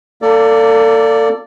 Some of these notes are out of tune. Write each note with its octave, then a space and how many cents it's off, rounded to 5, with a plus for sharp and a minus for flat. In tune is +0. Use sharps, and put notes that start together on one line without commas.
A#3 -5 A4 +30 D5 -5